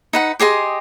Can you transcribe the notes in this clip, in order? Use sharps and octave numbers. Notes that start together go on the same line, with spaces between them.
D#4 B4 F#5
G4 G#4 D#5 C6